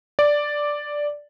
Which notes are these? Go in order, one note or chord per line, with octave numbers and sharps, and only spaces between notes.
D5